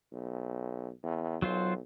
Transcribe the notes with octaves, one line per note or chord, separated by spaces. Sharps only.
B1
E2
B1 F#3 F4 C5